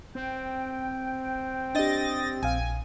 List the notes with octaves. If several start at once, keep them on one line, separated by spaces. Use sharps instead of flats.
C4 G5
D4 G4 D#5 A6 A#6
A#1 F5 G#5